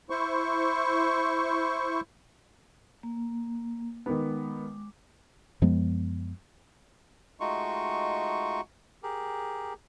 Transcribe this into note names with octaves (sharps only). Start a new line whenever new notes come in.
E4 C5 C#6
A#3
D#3 G#3 B3 D6
F#2 F3 G#3 B3
G#3 A3 D#4 F4 F#4 C#6
G4 G#4 A#4